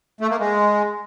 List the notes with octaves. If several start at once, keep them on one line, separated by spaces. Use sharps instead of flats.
A3
A#3
G#3